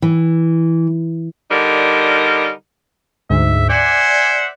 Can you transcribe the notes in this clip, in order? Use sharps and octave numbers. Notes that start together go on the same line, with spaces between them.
E3
D3 G3 D#4 A#4
D2 G#2 E5
C5 D5 E5 F#5 G#5